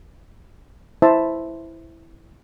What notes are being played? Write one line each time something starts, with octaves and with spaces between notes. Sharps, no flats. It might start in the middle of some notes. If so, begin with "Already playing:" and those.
E4 C5 E5 A5